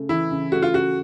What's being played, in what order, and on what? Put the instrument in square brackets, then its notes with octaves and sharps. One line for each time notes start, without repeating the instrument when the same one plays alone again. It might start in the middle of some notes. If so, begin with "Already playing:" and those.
Already playing: [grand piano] C#3 A3
[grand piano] E3 [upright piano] E4
[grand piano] C#3
[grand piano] A3 [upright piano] F#4
[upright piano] F4
[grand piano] C#3 [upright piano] F#4